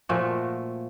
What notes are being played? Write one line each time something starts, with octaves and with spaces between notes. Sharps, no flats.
A#2 F3 A3 F#4